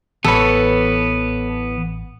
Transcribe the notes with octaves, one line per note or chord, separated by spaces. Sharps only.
A1 E3 B3 A4 C#5 B5